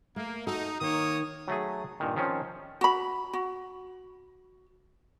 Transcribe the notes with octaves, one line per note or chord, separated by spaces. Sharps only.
A3 A#3
D#4 F#4 A4
D#3 A#3 C#5 D#6
F#3 A3 G#4
G2 A#2 D#3
D#3 F3 C4 C#4
F#4 B5
F#4